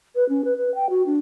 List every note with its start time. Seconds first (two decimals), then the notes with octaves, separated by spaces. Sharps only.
0.15 B4
0.29 C#4
0.44 B4
0.57 B4
0.74 G5
0.89 F#4
1.06 D4